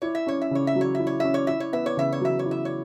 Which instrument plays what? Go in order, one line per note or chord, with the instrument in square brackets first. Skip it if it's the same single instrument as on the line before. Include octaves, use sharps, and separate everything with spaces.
[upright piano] E4 [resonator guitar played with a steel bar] C#5
[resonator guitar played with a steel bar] E5
[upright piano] C#4 [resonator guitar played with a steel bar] C#5
[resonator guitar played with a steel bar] E5
[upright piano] C#3 [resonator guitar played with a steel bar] C#5
[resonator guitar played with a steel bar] E5
[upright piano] F#3
[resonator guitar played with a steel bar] C#5
E5
[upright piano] E4
[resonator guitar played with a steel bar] C#5
[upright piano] C#4 [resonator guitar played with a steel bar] E5
[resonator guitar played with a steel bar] C#5
[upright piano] E4 [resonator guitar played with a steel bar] E5
[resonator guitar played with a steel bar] C#5
[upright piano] B3 [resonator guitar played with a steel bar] E5
[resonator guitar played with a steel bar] C#5
[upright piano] C#3 [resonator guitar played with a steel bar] E5
[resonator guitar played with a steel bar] C#5
[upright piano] F#3 [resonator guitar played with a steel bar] E5
[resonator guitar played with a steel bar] C#5
[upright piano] E4
[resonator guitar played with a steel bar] E5
C#5